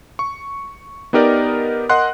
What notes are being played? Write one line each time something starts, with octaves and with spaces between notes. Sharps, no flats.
C#6
B3 D#4 G4 A#4 D5 D#5
A#4 D#5 F#5 C6 F#6